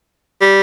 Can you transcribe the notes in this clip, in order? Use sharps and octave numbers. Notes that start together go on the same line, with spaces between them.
G3